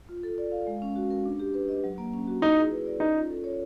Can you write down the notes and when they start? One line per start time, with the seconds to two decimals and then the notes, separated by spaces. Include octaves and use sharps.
0.09 F4
0.23 A4
0.38 D5
0.52 F5
0.67 G#3
0.82 C#4
0.96 F#4
1.11 A#4
1.26 D4
1.39 G4
1.54 B4
1.69 D#5
1.84 F#3
1.98 A#3
2.13 C#4
2.27 F#4
2.42 D#4 E4
2.57 G#4
2.71 B4
2.86 D5
3.00 C#4 D#4
3.15 F4
3.30 A4
3.44 C#5